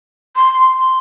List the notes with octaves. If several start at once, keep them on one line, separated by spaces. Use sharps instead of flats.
C6
C6